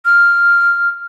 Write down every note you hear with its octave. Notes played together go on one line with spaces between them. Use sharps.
F6